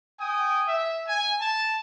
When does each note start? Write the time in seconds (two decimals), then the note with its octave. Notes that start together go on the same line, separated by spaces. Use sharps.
0.18 G5 G#5 D#6
0.66 E5
1.07 G#5
1.40 A5